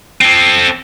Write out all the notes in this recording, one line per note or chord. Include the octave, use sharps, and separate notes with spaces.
C4 A4